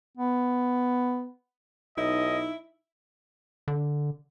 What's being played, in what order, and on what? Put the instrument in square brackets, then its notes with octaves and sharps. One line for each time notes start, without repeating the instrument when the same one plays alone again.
[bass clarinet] B3
[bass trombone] B1 [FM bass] D#4 [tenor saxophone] E4 [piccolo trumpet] D#5
[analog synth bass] D3